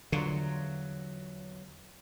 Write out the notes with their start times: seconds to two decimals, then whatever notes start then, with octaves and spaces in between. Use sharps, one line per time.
0.12 E2 D3 F#3 F4